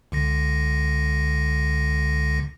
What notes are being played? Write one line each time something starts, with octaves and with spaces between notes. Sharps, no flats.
C#2 D3 A#6